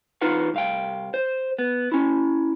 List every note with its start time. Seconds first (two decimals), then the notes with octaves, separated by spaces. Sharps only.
0.21 E2 D#4 F4 B4 F#5
0.54 C2 F5 G5
1.14 C5
1.59 B3
1.92 C#4 E4